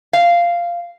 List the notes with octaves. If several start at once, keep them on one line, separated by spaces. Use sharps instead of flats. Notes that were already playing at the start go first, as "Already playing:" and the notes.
F5